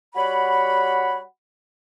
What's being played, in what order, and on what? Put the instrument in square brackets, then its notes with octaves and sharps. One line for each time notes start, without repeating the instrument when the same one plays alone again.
[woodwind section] G3 F#4 C#5 F#5 B5